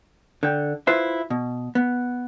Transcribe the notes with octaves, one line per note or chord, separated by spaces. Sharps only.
D3 G5
E4 F4 B4 C5 E5
B2
B3